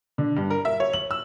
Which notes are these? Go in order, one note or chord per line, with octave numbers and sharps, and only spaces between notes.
D3
G2
A#4
E5
C#5
F#7
E6